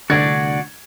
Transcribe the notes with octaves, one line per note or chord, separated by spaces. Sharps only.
C2 D3 A3 D4 F#4 D5 G#6